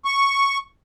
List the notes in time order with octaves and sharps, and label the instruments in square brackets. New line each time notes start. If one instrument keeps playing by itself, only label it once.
[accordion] C#6